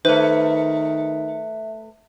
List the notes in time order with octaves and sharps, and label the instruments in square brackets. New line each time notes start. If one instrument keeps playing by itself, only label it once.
[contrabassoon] D#3 [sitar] A3 B4 [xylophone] C5 [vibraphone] E5